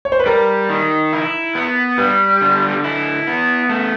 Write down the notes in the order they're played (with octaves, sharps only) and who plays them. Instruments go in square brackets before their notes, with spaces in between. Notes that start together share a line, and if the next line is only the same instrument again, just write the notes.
[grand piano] C#5
C5
B4
[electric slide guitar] G3 [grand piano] A#4
[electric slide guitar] D#3
E4
B3
[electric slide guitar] G3 [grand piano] B4
[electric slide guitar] D3
E4
B3
A3